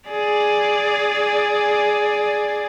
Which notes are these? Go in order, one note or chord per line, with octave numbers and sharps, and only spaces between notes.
G#4 D5